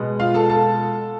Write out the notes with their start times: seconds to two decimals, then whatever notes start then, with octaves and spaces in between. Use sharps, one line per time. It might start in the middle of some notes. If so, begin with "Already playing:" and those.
Already playing: B2 G#3 B3
0.20 F4 F5
0.34 A4 A5
0.49 A4 A5